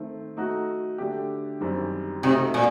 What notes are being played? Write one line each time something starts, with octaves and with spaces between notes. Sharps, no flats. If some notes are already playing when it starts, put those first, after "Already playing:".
Already playing: D#3 A3 C4
A3 D#4 F#4
D3 A3 D4 G4
F#2 D#3 G3 C4
C3 A3 D#4 F#4
A#2